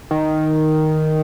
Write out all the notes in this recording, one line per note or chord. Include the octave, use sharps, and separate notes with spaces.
D#3